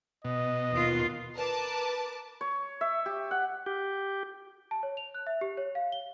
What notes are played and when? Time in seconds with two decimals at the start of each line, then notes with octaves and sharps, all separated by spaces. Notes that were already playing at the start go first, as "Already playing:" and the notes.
0.25 B2 D#5
0.72 D#2 F4
1.34 A#4 B4 A5 D6
2.41 C#5
2.81 E5
3.06 G4
3.31 F#5
3.66 G4
4.71 A5
4.83 C#5
4.97 F7
5.14 F#6
5.27 E5
5.41 G4
5.57 C#5
5.75 F5
5.92 G7